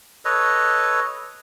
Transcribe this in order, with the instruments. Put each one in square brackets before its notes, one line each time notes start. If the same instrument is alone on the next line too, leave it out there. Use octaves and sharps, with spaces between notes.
[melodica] A4 B4 C#5 D#5